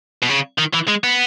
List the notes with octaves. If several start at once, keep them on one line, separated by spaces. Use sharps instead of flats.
B2
C#3
D#3
E3
G#3
B3